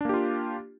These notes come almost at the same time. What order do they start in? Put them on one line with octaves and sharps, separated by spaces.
D4 A#3 G4 F4